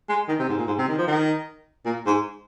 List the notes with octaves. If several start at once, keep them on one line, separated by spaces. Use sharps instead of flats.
G#3
D#3
C3
G#2
A#2
G#2
C3
D#3
F3
D#3
A#2
G#2